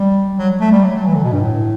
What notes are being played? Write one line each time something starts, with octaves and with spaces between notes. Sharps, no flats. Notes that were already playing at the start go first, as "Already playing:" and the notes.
Already playing: G3
F#3
A3
G3
F#3
F#3
E3
D3
B2
G2
A2